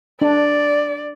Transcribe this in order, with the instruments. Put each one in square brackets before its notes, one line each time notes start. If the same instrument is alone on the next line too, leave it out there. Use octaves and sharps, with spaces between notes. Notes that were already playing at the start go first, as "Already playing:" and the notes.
[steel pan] D4 [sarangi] D5